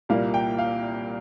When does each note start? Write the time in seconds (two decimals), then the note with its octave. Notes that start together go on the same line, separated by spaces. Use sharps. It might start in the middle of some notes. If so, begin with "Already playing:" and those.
0.09 C2 A#2 G3 A#3 F5
0.34 G5
0.58 F5